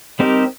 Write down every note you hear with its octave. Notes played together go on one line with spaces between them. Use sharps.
G3 C4 D#4 G4 A#4